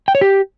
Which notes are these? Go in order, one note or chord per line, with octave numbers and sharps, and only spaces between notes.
G5
C#5
G4